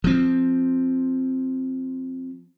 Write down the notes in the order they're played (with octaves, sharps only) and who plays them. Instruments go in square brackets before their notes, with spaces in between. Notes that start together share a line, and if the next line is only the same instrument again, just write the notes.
[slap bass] F3 C4